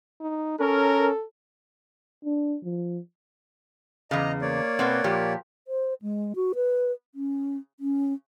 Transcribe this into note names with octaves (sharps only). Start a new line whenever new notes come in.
D#4
C#4 A4 A#4
D4
F3
E2 C#3 D#5 A#5
A#3 C#5 D5
B2 B3 C4
A#2 F3 G4
C5
G#3
F#4
B4
C#4
C#4